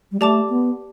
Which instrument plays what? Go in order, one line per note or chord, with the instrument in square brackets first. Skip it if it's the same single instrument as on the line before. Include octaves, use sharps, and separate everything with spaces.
[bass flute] G3
[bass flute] A3 [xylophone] G4 D5 A5 D6
[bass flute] B3